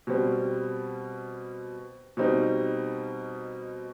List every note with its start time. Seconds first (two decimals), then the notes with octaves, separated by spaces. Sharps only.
0.07 B2 G3 C4
2.17 B2 G3 C4 D#4